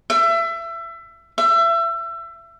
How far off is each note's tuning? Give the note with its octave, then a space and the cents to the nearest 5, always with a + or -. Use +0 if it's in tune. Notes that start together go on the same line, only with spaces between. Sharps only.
E5 +25
E5 +30